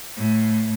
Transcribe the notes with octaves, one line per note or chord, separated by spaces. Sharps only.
A2